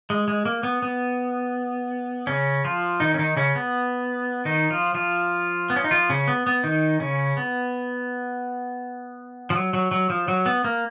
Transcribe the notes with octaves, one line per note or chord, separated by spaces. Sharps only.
G#3
G#3
A#3
B3
B3
C#3 C#4
F3 F4
D#3 D#4
C#4
D#3 D#4
C#3 C#4
B3
D#3 D#4
F3 F4
F3 F4
B3
C#4
D#4
F3 F4
C#3 C#4
B3
B3
D#3 D#4
C#3 C#4
B3
F3
F#3
F#3
F#3
F3
F#3
B3
A#3